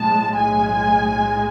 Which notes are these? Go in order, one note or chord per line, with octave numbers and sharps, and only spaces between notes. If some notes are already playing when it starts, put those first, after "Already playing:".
Already playing: B1 A2 G#3 A5
G#5